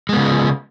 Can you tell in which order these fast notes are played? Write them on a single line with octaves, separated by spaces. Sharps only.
G#3 B3 C#3